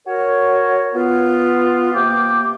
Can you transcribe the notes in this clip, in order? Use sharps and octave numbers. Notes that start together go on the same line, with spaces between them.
F#4 A#4 C#5
B3 F4
C3 A#3 G5 D6